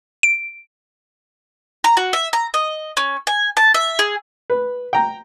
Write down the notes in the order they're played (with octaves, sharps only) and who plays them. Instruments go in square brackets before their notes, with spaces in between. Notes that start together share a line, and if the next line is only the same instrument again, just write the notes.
[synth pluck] D7
[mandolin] A#5
F#4
E5
A#5
D#5
C#4
G#5
A5
E5
G#4
[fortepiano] B4
G5 A#5